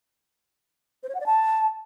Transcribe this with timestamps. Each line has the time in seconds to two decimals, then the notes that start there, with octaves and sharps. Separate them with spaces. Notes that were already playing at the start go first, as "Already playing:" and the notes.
1.03 C5
1.09 C#5
1.15 F#5
1.20 D5
1.26 A5